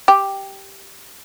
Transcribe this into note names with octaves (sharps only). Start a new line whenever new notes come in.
G4